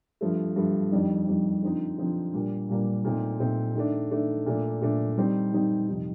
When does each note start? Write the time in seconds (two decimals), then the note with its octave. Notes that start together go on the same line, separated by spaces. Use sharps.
0.21 G2 F3 A3
0.56 G2 F3 A3
0.92 F2 D#3 G3 D4
1.27 F2 D#3 G3 D4
1.62 D3 F3 C4 D#4
1.98 D3 F3 C4 D#4
2.34 A#2 G3 A#3 D4
2.69 A#2 G3 A#3 D4
3.05 A#2 A3 C4 D#4
3.39 A#2 A3 C4 D#4
3.75 D#3 A3 D4
4.11 D#3 A3 D4
4.46 A#2 A3 D4
4.81 A#2 A3 D4
5.17 D#3 G3 C4 D#4
5.53 D#3 G3 C4 D#4
5.88 F2 C3 D#3